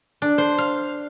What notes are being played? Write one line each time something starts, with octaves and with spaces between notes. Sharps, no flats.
D4
C5
F5